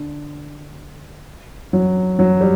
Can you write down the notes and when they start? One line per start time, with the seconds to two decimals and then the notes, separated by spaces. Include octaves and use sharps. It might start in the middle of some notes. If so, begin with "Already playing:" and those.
Already playing: D3
1.73 F#3
2.19 F#3
2.41 G3